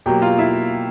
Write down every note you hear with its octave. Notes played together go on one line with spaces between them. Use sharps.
B2 F#3 A#3 G4 G5
F4 F5
E4 E5